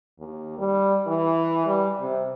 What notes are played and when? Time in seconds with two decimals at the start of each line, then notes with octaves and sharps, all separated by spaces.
0.19 D#2
0.58 G3
1.07 E3
1.66 G3
2.01 C3